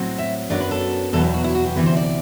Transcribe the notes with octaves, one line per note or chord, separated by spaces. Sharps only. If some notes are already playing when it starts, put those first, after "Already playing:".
Already playing: A2 F#3 C4
E5
F#2 F#3 B3 D4 D5
B4
A4
E2 B2 F#3 A4
G4
F#4
E4
F#4
G4
D2 C3 E3 B4
C5
D5